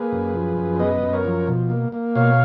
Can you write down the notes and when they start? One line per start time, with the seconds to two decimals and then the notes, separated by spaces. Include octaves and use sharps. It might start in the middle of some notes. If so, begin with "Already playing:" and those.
Already playing: A#3 G#4 B4
0.12 F#2
0.34 F3
0.57 F#2
0.79 B3 B4 D#5
1.02 F#2
1.13 A#4 C#5
1.25 F3
1.47 B2
1.70 A#3
1.92 A#3
2.15 B2 C#5 F5